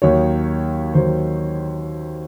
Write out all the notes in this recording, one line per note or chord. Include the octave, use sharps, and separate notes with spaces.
D#2 D#3 F#3 C#5
D#2 D#3 F#3 C5